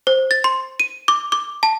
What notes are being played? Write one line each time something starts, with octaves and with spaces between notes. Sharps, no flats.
C5
A6
C6
D#7
D6
D6
A5